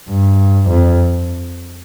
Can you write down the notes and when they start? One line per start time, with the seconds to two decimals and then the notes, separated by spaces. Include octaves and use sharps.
0.09 G2
0.69 F2